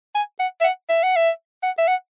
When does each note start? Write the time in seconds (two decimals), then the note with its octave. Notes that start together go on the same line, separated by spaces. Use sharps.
0.15 G#5
0.39 F#5
0.61 E5
0.64 F#5
0.89 E5
1.03 F#5
1.16 E5
1.63 F#5
1.78 E5
1.87 F#5